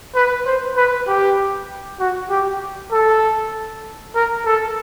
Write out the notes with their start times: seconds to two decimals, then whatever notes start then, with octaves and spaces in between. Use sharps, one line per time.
0.15 B4
0.46 C5
0.76 B4
1.07 G4
2.00 F#4
2.30 G4
2.92 A4
4.15 A#4
4.46 A4